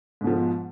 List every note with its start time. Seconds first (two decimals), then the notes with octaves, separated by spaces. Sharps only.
0.21 G#2
0.24 B2
0.27 F3